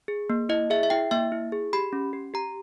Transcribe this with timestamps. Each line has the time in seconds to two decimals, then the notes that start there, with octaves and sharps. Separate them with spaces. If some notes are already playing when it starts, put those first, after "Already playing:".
0.08 G#4
0.30 A#3
0.49 E4 D#5
0.70 G#4 E5
0.83 E5
0.90 E4 G5
1.11 A#3 E5
1.32 E4
1.52 G#4
1.73 G4 B5
1.93 C#4
2.13 G4
2.34 G4 A#5